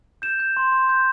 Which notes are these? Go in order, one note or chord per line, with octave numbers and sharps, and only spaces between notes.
G6 E7
G6
C6
C6
G6